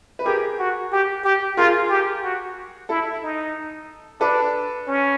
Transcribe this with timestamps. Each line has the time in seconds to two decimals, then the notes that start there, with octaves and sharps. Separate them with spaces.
0.19 B4
0.26 G4 G#4 A#4
0.59 F#4
0.92 G4
1.24 G4
1.57 F4 G#4 A#4
1.90 G4
2.23 F#4
2.89 E4 A4
3.22 D#4
4.21 D4 A4 B4
4.87 C#4